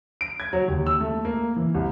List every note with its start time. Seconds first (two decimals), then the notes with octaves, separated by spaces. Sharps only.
0.21 D7
0.40 G#6
0.53 F#3
0.68 D#2
0.86 E6
1.00 A3
1.25 A#3
1.56 E3
1.74 C2